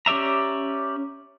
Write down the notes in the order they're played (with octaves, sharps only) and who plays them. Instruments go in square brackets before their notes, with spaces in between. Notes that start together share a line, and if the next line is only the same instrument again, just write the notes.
[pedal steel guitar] C#4 G4 D5 E5 A#5